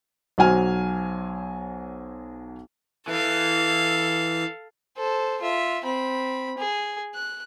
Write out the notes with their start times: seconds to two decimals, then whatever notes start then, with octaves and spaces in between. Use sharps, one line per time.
0.38 B1 F#3 C5 G#5 F6
3.08 E3 A4 F5
4.97 A4 C5
5.41 F4 E5
5.84 C4 B5
6.58 G#4
7.14 F#6